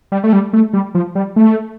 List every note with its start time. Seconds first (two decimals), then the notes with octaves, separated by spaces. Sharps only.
0.12 G3
0.24 A3
0.33 G3
0.53 A3
0.73 G3
0.95 F3
1.15 G3
1.36 A3